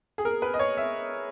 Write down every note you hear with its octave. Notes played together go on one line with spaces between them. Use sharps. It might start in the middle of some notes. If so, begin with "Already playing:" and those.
G#4
A#4
B4
D#5
C#5
E5